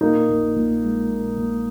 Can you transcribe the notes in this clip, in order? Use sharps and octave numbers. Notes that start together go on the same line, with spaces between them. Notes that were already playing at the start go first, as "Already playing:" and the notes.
A#2 A#3 D#4
A#1
A#1
G#3
A#2
A#1